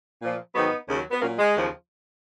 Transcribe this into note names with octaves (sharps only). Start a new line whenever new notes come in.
A#2 F3
G#2 D#3 F#3 B3 D#4
D#2 C#3 F#3
B3
A#2 F#3 A#3 C#4
G#3
D#2 C#3 F3